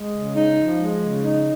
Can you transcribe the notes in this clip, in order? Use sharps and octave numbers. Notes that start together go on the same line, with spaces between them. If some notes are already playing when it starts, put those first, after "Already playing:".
Already playing: G#3
C#3
D#4
F3
G#3
C#3
D#4